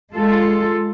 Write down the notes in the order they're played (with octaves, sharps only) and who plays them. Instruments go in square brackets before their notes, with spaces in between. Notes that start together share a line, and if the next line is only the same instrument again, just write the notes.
[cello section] G#3 F4 A4